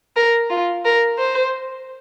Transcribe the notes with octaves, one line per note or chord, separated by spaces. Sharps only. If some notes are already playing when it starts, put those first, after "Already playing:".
A#4
F4
A#4
C5